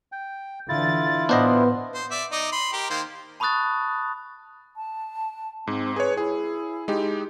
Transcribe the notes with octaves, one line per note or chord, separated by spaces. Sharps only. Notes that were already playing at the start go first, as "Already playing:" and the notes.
G5
D3 E3 E4 F4 A6
A2 B3 D4 C5 D#5
C5
D5 E5
D#4 D5 D#5
B5 C6
G4 A#4
D#3 A#3 C5
A5 B5 C#6 D#6 F#6 A6
A5
G#2 C4
G#4 B4 C#5
E4 G#4
G#3 D#4 G4